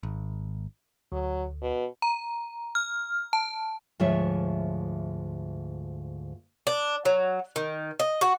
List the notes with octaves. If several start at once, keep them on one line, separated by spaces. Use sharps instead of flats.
G#1
D2 F#3
B2
A#5
F6
A5
D2 G#2 F3 F4 C#5 E5
D4
F#3
D#3
D#5
F#4